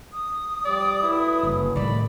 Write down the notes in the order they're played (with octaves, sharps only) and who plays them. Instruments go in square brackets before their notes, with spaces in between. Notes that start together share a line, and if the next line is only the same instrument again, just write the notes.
[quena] D#6
[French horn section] F3 G3 [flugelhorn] D5
[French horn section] F#3 A3 B4 [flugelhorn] E4
[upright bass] F#1
[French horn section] F2 G3 A3 [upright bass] A2 D#3 [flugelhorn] D5 [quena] B5